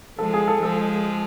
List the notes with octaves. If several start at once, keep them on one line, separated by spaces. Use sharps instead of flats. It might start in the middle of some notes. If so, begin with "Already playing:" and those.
F3 G#3 A4
G#4
A4
F3 G#3 A4